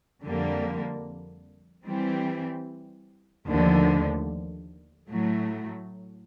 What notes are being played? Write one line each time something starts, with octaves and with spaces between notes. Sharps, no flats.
F2 D3 G3 A#3
E3 G3 C4
D#2 D3 F3 A3
A2 F#3 A3